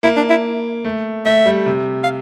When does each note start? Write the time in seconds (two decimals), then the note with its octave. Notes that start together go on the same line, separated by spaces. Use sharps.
0.03 A#3 E4
0.16 D4
0.30 E4
0.85 A3
1.26 A3 E5
1.46 G3
1.66 C3
2.04 F5